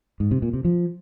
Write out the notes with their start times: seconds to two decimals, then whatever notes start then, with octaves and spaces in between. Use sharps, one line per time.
0.20 G#2
0.31 C3
0.42 A#2
0.53 C3
0.65 F3